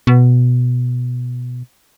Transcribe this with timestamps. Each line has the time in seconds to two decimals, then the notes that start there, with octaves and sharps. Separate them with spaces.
0.07 B2